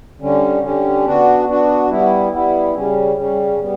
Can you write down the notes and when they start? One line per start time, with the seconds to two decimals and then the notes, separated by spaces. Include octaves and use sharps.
0.20 D3 G3 C#4
0.62 D3 G3 C#4
1.05 B3 D4 F#4
1.47 B3 D4 F#4
1.90 G3 B3 E4
2.32 G3 B3 E4
2.75 C#3 G3 C#4
3.16 C#3 G3 C#4
3.59 G3 B3